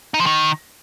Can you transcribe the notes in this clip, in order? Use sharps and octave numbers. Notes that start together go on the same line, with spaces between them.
D#4
F3
D#3